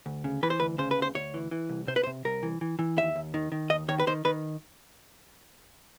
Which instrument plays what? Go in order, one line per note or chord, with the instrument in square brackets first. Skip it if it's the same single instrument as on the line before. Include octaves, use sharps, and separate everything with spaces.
[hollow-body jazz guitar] D2
C#3
E3 B4
C5
D2 B4
C#3 C5
B4
D2 C5
D2 C#5
E3
E3
C2
C3 C5
B4
C5
C3
C2 A#4
E3
E3
E3
D#2 E5
D#2
D#3
D#3
D#2 D#5
D#3 C#5
B4
D#3 C5
D#3 B4